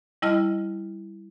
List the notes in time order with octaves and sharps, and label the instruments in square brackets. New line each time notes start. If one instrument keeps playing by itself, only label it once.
[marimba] G3 E4 D#5 A5 F6